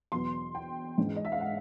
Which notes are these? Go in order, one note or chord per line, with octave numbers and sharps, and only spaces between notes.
E2 B2 F#3 B3 C6
G5
G#2 E3 G#3 C#4
D#5
E5
F5
F#5